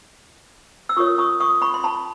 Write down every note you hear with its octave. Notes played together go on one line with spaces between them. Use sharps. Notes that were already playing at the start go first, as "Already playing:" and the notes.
E6
F4 A#4 C#5 C#6 D#6
C#6 D#6
C#6 D#6
B5 C#6
C6
A5 B5